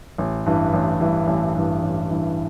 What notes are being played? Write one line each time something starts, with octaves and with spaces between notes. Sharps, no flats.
A1
G2 E3
A1
G2 E3
A1
G2 E3
A1
G2 E3